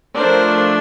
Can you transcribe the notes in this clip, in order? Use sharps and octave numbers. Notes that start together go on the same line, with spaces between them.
F3 A3 D4 A#4 C5